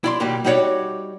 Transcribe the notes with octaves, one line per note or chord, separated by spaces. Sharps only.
E4 D5 C6
B2 D#3 G3 A#3
G3 D#4 F#4 G4 C#5 D5